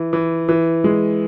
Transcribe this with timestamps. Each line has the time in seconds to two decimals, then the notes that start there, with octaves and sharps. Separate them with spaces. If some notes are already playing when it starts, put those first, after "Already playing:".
Already playing: E3
0.13 E3
0.49 E3
0.84 G#3